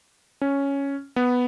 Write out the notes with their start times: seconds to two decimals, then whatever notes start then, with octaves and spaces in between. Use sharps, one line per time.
0.41 C#4
1.16 B3